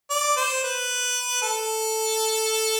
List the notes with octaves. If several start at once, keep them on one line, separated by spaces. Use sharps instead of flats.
D5
C5
B4
A4